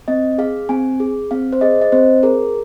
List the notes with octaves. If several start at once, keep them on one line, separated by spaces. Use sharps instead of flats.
C4 D#5
G#4 F5
C4 G#5
G#4
C4 F5
C5
G#4 D#5
D#5
C4 C5
G#4 A#4